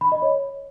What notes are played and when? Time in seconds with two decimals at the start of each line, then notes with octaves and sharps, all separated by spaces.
0.01 B5
0.12 D#5
0.22 C#5